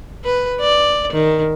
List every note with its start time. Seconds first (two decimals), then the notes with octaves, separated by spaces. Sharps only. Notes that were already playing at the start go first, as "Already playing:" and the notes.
0.24 B4
0.61 D5
1.13 D#3